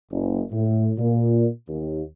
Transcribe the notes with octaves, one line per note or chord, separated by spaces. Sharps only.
F#1
A2
A#2
D#2